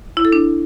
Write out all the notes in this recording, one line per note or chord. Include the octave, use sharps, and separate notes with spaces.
E4
A4
D4